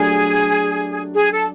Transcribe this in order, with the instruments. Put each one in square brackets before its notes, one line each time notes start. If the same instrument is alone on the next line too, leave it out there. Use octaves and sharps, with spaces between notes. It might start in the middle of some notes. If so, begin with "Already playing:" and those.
Already playing: [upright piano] F#3 A3 D4 G4 [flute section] G#4
[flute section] G#4
A4